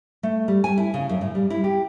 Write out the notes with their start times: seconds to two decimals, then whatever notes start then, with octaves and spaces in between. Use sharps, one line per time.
0.23 A3
0.48 G3
0.64 G#5
0.78 E4
0.94 C#3
1.09 F#2
1.21 A2
1.35 G3
1.50 E4
1.64 G4